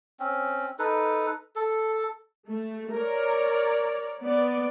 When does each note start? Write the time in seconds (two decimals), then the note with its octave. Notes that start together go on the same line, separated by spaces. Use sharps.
0.20 C4 C#4
0.79 D#4 A4 B4
1.56 A4
2.47 A3
2.93 A#4 C#5 D5
4.22 B3 D5